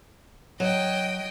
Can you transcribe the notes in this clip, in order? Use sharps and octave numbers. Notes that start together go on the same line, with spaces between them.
F#3 D#5 G5